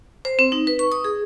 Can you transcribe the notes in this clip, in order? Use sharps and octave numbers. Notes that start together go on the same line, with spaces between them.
C5
C4
D#4
B4
C#6
D#6
G#4